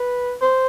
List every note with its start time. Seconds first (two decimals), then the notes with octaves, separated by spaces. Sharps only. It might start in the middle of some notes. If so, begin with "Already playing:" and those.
Already playing: B4
0.42 C5